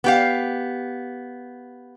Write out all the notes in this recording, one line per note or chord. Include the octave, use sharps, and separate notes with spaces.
B3 G4 F5